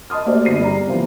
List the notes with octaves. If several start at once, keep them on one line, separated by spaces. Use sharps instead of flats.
D#5 A5 C6 D#6 F6
A3 A#3 F#4 G4 C5 D5
G1 C7 D#7
G3 D5 A#5
C3 E3 F3 A#3 B3